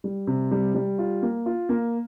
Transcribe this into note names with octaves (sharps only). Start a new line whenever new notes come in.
G3
C3
G3
G3
F4
A#3
F4
A#3